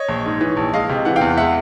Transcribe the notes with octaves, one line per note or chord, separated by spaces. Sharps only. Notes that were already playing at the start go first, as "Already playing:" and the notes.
Already playing: C#5 D#5
A#1
G#2
E3
A#1
G#3 D#5 F5
C3
E3 F#5
F5 G5
E2
G#3 E5 F#5